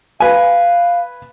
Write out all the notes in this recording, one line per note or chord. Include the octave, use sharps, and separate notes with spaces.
B4 F5 G#5